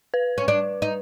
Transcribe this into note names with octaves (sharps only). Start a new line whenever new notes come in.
B4
C#4
D4
D#4